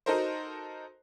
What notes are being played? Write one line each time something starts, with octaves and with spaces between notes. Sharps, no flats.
D#4 F#4 A4 A#4 C5